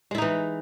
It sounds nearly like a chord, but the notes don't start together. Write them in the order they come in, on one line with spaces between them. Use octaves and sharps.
G#3 E4 D#4 E3